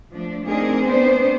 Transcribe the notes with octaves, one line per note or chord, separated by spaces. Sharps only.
F3 A3 D4
A3 C4 D4 D#4 G#4 A#4
B3 C4 D4 C5